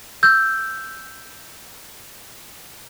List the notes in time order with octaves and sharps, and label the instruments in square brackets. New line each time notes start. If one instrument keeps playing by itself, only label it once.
[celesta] E6 G6